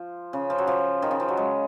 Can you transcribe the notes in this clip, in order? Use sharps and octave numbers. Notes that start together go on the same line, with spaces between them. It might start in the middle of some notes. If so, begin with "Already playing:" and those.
Already playing: F3
C#3
F3
F#3
F3
D#3
C#3
F3
F#3
G#3